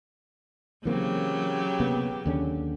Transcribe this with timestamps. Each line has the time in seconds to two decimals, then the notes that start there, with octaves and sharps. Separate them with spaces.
0.85 C#3 E3 F#3 A#3 C4 G4
1.80 C3 A#3 B3
2.26 D#2 D3 C#4